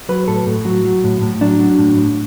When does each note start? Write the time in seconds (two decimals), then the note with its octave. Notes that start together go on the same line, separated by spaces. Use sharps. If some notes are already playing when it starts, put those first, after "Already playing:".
0.09 F#3 B4
0.28 A2 A4
0.47 A2
0.65 F#3 F#4
0.85 F#3
1.04 A2
1.22 A2
1.41 F#3 D4
1.59 F#3
1.79 A2
1.97 A2